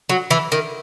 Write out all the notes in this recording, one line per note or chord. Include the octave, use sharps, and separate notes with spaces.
F#3
E3
D#3